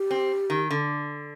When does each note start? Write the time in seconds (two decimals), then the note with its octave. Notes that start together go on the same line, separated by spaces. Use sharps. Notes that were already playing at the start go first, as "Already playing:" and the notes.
Already playing: G4
0.11 C4
0.50 D#3
0.71 D3